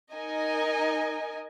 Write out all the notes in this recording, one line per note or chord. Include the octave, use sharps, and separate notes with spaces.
D#4 A#4 D#5 G#5